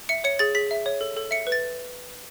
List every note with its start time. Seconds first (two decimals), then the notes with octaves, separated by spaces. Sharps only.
0.09 E5 C#7
0.24 C#5 C#7
0.39 G#4 A6
0.55 G#4 B6
0.71 E5
0.86 C#5
1.01 A4
1.16 A4
1.31 E5 C#7
1.47 B4
1.52 A6